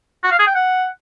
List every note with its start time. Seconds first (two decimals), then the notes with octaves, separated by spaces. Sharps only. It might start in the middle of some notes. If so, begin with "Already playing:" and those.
0.23 F#4
0.31 F5
0.39 G#4
0.47 G5
0.55 F#5